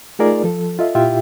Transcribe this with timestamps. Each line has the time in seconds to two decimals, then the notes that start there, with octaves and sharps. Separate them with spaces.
0.19 A3 D#4 F4 G#4 A#4 D5
0.44 F3 A4
0.79 F4 A4 D#5 E5
0.95 A#2 E4 F4 G4 E5 G5